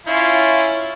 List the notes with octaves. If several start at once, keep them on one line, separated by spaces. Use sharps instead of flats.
C#4 E4 F4